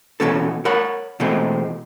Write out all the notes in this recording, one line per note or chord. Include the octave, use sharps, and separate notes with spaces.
B2 D#3 E3 C#4 F#4 A4
A#4 C#5 F#5 B5
B2 E3 G#3 A3 C4